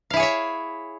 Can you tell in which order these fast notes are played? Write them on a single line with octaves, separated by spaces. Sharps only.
F5 E4 G#4 C#5 E5